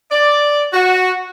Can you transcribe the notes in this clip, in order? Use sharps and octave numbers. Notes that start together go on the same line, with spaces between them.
D5
F#4